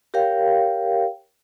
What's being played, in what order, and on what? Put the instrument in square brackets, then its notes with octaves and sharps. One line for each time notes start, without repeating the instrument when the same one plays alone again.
[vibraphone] G4 A#4 C#5 F5 G5